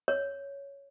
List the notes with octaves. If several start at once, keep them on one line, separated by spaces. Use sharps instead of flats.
C#5